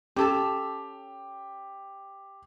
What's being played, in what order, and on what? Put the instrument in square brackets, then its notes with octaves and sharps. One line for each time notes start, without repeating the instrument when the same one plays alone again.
[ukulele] C#4 A4 A5 [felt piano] G4